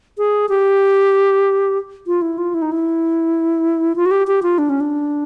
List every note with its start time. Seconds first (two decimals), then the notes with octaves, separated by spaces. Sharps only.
0.18 G#4
0.49 G4
2.07 F4
2.22 E4
2.38 F4
2.54 E4
2.62 D#4
2.72 E4
3.96 F4
4.06 F#4
4.11 G4
4.27 G4
4.43 F4
4.58 D4
4.69 C#4
4.80 D4